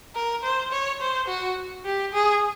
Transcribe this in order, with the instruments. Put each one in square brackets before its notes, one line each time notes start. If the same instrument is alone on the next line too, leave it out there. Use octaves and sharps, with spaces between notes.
[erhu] A#4
C5
C#5
C5
F#4
G4
G#4